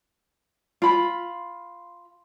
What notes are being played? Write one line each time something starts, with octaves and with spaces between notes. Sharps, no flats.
F4 B5